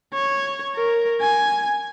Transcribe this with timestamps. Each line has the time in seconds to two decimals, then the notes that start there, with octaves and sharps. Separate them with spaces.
0.13 C#5
0.75 A#4
1.21 G#5